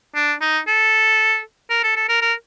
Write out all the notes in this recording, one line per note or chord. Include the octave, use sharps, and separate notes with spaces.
D4
D#4
A4
A#4
A4
A4
A#4
A#4